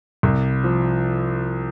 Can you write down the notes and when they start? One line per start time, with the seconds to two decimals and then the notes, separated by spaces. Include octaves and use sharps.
0.23 C2
0.64 F3